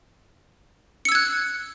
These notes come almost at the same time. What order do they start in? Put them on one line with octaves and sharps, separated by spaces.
C#7 E6 G#6 F#6